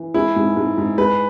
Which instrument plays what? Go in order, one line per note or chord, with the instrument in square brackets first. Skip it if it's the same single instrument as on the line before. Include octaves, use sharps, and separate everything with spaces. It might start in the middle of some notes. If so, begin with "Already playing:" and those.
Already playing: [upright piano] E3
[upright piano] G#3 [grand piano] E4
[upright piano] G#2
G#2
G#2
[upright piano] G#3 [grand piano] B4